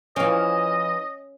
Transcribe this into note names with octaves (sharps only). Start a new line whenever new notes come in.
E3 F3 C#4 D#5 F5 G5